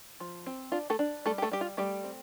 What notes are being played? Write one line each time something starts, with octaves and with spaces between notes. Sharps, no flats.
F3
C4
D4 F4
A3 A4
D4
G3 A3 A4
G4
A3 A4
G3 G4
F4
G3 A3 G4
C4